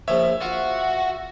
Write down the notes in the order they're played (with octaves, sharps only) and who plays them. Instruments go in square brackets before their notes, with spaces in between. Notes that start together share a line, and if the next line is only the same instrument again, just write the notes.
[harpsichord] A#1 F3 C#5 [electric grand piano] E5
[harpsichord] F4 [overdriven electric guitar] F#4